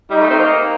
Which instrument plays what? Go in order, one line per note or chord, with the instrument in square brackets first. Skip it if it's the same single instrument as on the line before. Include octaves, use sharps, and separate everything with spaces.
[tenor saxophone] G3 [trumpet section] D#4
[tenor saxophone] A3
C4
A#3